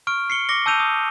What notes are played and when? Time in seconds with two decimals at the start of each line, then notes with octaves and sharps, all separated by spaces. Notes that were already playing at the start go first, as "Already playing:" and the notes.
0.07 C#6 F6 D7
0.30 C7 C#7 G7
0.49 D6 A#6 C#7 G7
0.66 A5 E6 G6 D#7 F7
0.80 D#6